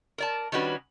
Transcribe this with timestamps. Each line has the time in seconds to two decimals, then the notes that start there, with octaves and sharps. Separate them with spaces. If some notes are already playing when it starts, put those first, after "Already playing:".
0.18 A#4 D5 A5
0.52 D#3 G3 C#4 D4 F#4 B4